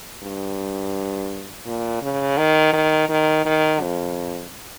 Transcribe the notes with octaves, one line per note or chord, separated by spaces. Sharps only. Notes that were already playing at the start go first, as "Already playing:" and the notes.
G2
A#2
C#3
D#3
D#3
D#3
D#3
F2